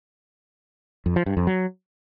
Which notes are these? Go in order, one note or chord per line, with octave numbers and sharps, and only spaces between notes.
F2
F3
G2
F2
F#3